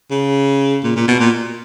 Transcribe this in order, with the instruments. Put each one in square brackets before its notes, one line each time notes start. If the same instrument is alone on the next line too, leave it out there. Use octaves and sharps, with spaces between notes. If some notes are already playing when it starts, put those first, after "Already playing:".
[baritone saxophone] C#3
A#2
A#2
B2
A#2